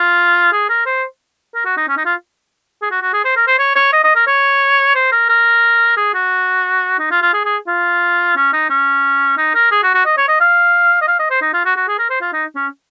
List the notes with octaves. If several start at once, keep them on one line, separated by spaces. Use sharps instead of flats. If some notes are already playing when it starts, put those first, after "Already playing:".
Already playing: F4
G#4
A#4
C5
A#4
F#4
D#4
C#4
D#4
F4
G#4
F#4
F#4
G#4
C5
A#4
C5
C#5
C#5
D#5
D#5
A#4
C#5
C5
A#4
A#4
G#4
F#4
D#4
F4
F4
G#4
G#4
F4
C#4
D#4
C#4
D#4
A#4
G#4
F#4
F#4
D#5
C#5
D#5
F5
D#5
F5
D#5
C5
D#4
F4
F#4
F#4
G#4
A#4
C5
F4
D#4
C#4